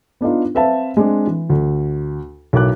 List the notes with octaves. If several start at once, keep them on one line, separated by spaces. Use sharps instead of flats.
B3 D4 D#4 F4
C4 B4 E5 F5 A5
G#3 C4 D4
E3
D2
B1 E4 A#4 D6 F#6